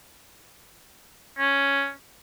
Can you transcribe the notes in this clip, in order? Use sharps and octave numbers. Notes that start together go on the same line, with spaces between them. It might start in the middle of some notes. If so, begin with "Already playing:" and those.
C#4